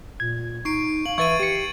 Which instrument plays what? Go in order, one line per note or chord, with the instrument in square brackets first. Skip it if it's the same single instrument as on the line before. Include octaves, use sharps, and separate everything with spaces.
[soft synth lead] A#2 [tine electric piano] G#6
[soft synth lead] D#4 [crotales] C#6 C7 D7
[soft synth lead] F5 [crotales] F#7
[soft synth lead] E3 [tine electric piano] B4 E5 C#6 [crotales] G#6 A6 D#7
[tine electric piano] G4 C#7 [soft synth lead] C7 [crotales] D#7